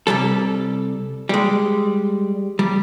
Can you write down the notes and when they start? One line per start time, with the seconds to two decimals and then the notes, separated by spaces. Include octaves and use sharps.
0.07 C2 F#2 G3 A4
1.29 G3 G#3
2.59 G3